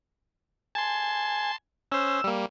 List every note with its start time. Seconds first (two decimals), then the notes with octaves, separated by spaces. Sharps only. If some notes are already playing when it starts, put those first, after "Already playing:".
0.75 G#5 A5 C6
1.92 C#4 C5 E6
2.24 G3 A#3